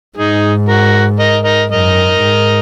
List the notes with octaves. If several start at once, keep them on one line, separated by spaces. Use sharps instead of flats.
G#2 D#4 G#4
F#4 A#4
A#4 D#5
A#4 D#5
F#2 A#4 D#5
G#2